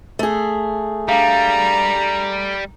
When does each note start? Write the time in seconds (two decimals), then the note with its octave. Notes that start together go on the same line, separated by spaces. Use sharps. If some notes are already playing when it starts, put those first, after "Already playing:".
0.19 A3 G#4
1.08 G3 D4 F5 A#5